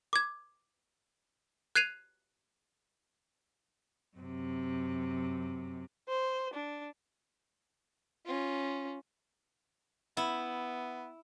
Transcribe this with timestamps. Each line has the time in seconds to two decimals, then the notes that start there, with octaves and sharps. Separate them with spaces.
0.13 D6 G#6
1.75 F#6 G#6 C7 D#7 F7
4.17 F#2 C3
6.08 C5
6.53 D4
8.26 C#4 F4
10.17 B3 E4